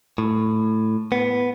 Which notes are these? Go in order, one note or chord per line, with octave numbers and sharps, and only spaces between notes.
A2
B3